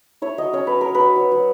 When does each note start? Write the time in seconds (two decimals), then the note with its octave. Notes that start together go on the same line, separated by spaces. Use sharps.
0.22 E4 C#5
0.38 F#3 D#5
0.53 C#4 C#5
0.67 F#3 B4
0.81 F#3 A#4
0.95 B4
1.00 F#3
1.16 F#3
1.32 F#3